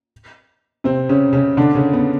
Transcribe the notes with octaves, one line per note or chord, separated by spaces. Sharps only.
C3 C4
C#3 C#4
C#3 C#4
D3 D4
C#3 C#4
B3